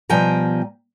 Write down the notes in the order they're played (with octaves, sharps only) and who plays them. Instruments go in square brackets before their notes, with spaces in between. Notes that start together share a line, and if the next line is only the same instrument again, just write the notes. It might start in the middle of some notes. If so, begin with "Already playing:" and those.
[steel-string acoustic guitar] B2 F3 G3 G5 G#5 A#5